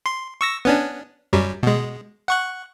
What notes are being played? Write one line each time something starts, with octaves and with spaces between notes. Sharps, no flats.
C6
C#6 E6 A#6
B3 C#4 D4
F#2 F#3 G3
B2 G#3
F#5 C#6 F#6